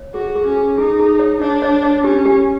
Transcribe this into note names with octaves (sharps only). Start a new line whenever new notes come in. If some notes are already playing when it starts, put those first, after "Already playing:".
Already playing: C#5
F#4 G#4
G#4
C#4
G#4
D#4 G#4
G#4
C#5
D4 C#5
C#5
C#5
C#4 G4
G4